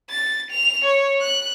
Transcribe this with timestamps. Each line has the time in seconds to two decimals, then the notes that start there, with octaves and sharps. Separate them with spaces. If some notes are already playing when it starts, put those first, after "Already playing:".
0.10 A6
0.51 F7
0.84 C#5
1.21 F#6